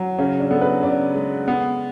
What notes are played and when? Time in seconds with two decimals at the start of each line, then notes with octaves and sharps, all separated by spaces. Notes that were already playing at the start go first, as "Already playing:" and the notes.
Already playing: F#3
0.19 C#3 C#4
0.40 D4
0.51 B3 A4
0.61 B4
0.83 C#3 D5
1.15 G#3
1.48 B3